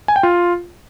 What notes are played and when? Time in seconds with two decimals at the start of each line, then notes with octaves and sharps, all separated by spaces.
0.08 G#5
0.16 G5
0.23 F4